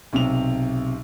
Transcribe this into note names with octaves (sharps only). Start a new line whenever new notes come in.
B1 C3 F7